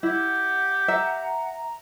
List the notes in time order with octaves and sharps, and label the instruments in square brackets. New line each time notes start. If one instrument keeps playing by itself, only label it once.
[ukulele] E4 [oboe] G4 [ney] F#5
[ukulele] E5 [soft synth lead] A#5